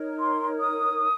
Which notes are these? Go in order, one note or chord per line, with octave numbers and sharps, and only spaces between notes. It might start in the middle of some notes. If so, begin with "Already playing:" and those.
Already playing: D#4 A#4 C#5
C6
D#6